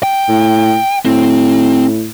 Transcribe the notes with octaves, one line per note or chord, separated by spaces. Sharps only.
G5
A2
A2 C4